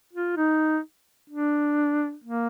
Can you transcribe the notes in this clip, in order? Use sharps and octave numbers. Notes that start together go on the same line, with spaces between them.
F4
D#4
D4
A#3